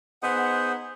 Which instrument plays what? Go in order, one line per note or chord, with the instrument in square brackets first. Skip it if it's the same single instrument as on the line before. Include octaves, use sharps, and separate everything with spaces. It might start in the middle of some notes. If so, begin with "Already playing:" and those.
[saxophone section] B3 D#4 F#5 [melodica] G#4 C5